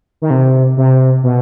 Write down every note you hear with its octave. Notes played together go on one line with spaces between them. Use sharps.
D#3
C3
C3
B2